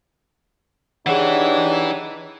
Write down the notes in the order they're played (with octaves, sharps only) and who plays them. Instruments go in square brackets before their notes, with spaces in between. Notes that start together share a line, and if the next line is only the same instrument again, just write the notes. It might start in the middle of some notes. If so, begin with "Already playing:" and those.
[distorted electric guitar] E3 [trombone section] D4 D#4 G4 [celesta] G#4 F#5 [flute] C#5